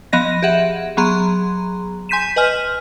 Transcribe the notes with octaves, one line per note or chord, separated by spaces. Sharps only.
F3 B3 D#5 A#6
G4 G#4 E5 F#5
F#3 B3 G#4 A#5 C6
G#5 C6 G6 B6 D#7 E7
B4 D#5 G#5 F6